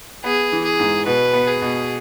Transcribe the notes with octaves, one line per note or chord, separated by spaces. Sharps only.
B3 G#4
E3
G#4
G#2
B2 B4
B3
G#4
B2